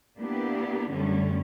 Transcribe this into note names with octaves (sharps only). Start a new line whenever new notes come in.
A#3 B3 D4 E4 G4
F#2 D3 G3 A3 C#4